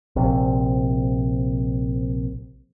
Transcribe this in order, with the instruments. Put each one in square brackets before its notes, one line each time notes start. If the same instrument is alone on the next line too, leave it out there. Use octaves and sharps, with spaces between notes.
[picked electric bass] A#1 C3